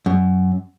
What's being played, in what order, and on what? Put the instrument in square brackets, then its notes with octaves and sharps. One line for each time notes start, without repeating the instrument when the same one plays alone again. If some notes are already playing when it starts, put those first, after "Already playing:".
[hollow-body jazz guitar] F#2